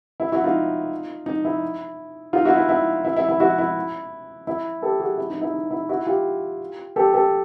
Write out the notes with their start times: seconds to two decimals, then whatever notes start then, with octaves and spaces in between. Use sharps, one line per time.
0.20 E4
0.32 E4 F#4
0.44 D#4 F4
1.26 D#4
1.45 E4
2.33 D#4 F4
2.45 E4 F#4
2.57 E4
2.69 E4
3.05 E4
3.17 E4
3.29 E4
3.40 E4 F#4
3.58 E4
4.47 E4
4.82 G4 A4
5.00 F#4 G#4
5.17 E4
5.30 D#4
5.42 E4
5.54 D#4
5.71 E4
5.89 E4 F#4
6.06 F4 G4
6.96 G4 A4
7.13 G4 A4